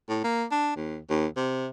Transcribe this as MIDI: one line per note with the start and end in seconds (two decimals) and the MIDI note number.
0.09 0.22 45
0.24 0.45 58
0.51 0.75 62
0.76 0.98 39
1.10 1.27 39
1.37 1.68 48